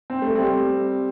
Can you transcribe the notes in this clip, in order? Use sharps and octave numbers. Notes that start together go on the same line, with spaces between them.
C4
A3
G3 C4